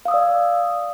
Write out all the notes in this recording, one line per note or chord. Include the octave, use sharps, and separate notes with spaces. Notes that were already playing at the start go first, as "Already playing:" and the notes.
D5 F5 D#6 E6